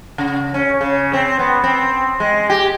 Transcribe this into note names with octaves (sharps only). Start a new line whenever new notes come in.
C#3
C#4
C#3
C4
B3
C4
G#3
G4